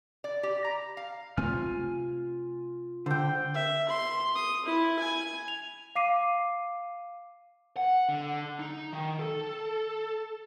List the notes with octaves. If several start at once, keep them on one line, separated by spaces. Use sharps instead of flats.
D5
G4
A#5
F5
C3 A3 C4 F4 G#5 F6
D3 C5 G5
E5
C6
D#6
E4
G#5
F7
F5 D6 C7 D#7
F#5
D3
D#4
D#3
A4